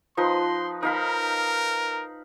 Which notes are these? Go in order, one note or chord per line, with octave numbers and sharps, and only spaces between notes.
F3 D#4 B4 C6
D#4 A#4 F5 B5